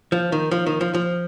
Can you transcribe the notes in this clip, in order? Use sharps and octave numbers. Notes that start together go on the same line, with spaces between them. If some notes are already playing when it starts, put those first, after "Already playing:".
F3
D#3
F3
D#3
F3
F3